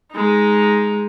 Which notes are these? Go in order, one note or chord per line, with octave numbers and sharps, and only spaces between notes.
G#3 D#4